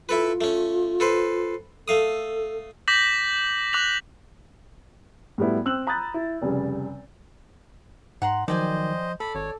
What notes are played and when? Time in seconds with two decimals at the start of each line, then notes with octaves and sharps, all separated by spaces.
0.09 E4 F4 A4 B4
0.41 A3 C#4
1.00 A4 B4 C5
1.88 A3 A4 F5 D#6
2.88 D6 G6 A#6 B6 F#7
3.73 D6 F#6 A#6 F7 F#7
5.38 A2 F#3 G3 A3 B3 E4
5.65 C4 E6 F#6 F#7
5.87 A#5 B5 D#6 F#6 G6 A6
6.14 E4
6.42 F1 C#3 G3
8.22 G#2 F#5 A#5 C6
8.48 D#3 F3 F#3 C5 D5 D#5 G5 G#5
9.20 A4 D5 B5
9.35 G#1 C#5